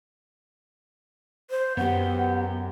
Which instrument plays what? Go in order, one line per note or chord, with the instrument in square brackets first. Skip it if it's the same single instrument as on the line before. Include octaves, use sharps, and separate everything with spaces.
[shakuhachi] C5
[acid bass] F#2 [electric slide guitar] B3 G4 [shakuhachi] F#5